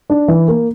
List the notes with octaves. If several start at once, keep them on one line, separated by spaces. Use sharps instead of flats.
D4
E3
A#3